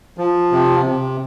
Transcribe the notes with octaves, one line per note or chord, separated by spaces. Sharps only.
F3
C3
C3